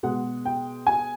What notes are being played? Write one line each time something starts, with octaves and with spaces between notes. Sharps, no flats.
B2 G#3 F#5
G5
G#5